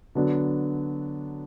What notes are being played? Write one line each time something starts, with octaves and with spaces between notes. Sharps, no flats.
D3 F#3 B3 D4